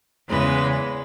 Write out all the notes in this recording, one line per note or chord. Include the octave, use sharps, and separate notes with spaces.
E2 C#3 E3 G#3 B4